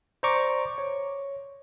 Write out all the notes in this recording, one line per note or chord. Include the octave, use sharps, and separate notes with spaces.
C5 D5 A#5 C#6 D6
C#5